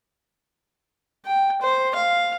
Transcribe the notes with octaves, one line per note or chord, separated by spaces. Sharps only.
G5
C5
F5